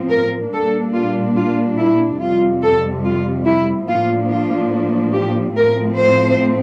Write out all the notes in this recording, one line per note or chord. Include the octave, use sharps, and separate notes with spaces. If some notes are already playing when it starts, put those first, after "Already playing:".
Already playing: A2 F3 C4
A#4
A#2 G3 A#3 D4 A4
F4
F4
E4
F2 C3 G3 F4
A4
F4
E4
A2 F3 A#3 D4 F4
F4
G4
A2 F3 A3 C4 A#4
C5